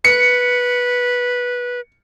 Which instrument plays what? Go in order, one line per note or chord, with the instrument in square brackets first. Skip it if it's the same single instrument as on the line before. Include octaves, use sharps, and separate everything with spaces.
[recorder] B4 [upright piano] C#7